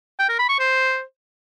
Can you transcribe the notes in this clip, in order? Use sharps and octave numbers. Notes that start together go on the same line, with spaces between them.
G5
A#4
B5
C#6
C5